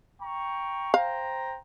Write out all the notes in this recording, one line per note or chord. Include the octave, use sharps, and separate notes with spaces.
G5 A#5 C#6
C5 F5 G5 A#5